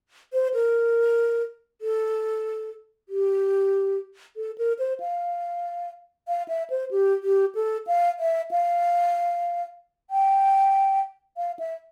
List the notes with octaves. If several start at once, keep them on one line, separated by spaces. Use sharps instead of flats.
C5
A#4
A4
G4
A4
A#4
C5
F5
F5
E5
C5
G4
G4
A4
F5
E5
F5
G5
F5
E5